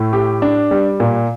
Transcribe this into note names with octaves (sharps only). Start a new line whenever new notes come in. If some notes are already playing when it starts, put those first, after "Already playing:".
Already playing: A2 A3
G4
D4
G3
A#2